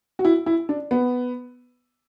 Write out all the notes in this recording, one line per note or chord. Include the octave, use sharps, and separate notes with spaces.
F#4
E4
E4
D4
B3